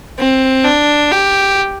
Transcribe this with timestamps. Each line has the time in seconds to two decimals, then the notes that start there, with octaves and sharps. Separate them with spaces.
0.19 C4
0.65 D4
1.11 G4